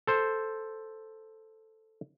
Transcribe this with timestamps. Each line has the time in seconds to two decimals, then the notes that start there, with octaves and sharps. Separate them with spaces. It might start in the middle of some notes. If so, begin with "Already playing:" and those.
0.07 A4 C5